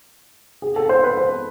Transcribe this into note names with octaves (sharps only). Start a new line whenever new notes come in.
G#4
A4
C5
B4
C5